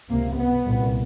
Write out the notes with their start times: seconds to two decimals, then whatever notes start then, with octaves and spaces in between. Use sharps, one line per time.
0.10 C#2 C3 A#3
0.37 B3
0.65 C2 A#2